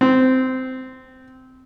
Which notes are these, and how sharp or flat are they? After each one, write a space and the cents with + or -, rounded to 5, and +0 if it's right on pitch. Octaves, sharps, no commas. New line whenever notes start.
C4 -15